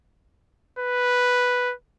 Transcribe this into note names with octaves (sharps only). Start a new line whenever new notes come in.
B4